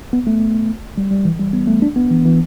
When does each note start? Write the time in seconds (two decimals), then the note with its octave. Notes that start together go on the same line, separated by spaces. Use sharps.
0.13 B3
0.27 A3
0.98 G3
1.11 G3
1.25 E3
1.39 G3
1.53 B3
1.68 A3
1.82 D4
1.96 B3
2.11 E3
2.25 E3